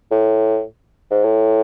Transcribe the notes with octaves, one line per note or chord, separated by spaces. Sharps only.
A2
G#2
A2